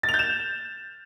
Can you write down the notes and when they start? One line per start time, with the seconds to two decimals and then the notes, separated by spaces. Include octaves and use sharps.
0.03 A6
0.09 F7
0.14 G6
0.19 E7